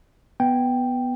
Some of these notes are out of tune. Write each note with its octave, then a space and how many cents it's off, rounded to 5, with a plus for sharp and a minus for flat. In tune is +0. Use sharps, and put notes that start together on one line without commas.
B3 +0 G5 +0